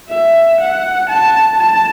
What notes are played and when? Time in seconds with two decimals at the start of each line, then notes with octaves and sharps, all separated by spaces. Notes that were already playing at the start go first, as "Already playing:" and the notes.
0.09 E5
0.60 F#5
1.09 A5
1.60 A5